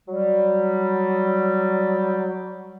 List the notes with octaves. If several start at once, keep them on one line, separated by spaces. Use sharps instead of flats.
F#3 G3